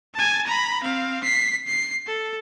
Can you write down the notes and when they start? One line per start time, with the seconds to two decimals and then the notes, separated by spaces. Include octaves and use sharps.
0.15 G#5 A5
0.47 A#5 B5
0.83 C4 F5
1.24 B6 C7
1.67 C7
2.07 A4